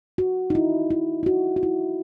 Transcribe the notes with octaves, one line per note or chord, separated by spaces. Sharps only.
F#4
D#4
E4
E4
E4
F#4
F#4
E4